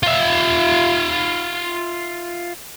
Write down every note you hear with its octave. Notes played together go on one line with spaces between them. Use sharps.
F4 E5